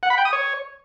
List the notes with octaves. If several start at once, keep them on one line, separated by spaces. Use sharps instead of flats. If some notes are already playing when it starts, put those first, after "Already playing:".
F#5
B5
G5
D#6
C#5